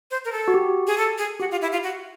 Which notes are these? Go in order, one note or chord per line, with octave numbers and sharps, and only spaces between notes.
C5
A#4
A4
F#4
G4
G#4
A4
G#4
F#4 G4
F4
E4
F4
F#4